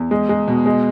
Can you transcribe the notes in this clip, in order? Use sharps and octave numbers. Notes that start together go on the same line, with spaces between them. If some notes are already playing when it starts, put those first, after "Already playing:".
Already playing: E2
G#3
G#3
B2
G#3